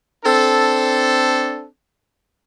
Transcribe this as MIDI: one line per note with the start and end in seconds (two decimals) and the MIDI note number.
0.25 1.65 60
0.25 1.65 62
0.25 1.65 69